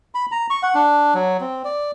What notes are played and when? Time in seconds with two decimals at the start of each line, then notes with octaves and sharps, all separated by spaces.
0.15 B5
0.32 A#5
0.50 C#6
0.63 F#5
0.75 D4
1.14 F#3
1.41 C4
1.65 D5